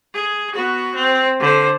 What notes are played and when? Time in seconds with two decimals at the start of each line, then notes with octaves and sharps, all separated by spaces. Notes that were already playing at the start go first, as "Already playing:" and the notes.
0.14 G#4
0.55 B3 F#4
0.95 C4
1.40 D3 C5